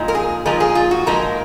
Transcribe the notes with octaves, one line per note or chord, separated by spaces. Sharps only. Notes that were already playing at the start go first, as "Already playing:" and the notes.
Already playing: A#2 F3 G#3 D#4
A#4
G#4
A#2 F3 G#3 D#4 A#4
G#4
F4
F#4
A#2 F3 G#3 D#4 A#4